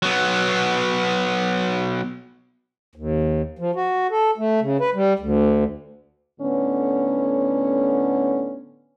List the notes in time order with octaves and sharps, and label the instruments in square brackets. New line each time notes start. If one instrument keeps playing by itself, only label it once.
[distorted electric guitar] F#3 B3
[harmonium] D#2
F3
F#4
A4
A3
C#3
B4
G3
D2
[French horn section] A2 D3 B3 C#4